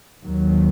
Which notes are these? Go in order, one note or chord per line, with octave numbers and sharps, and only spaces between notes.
D#2 D#3 F#3